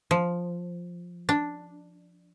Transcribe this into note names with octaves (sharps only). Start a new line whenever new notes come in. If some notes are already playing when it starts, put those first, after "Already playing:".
F3
D4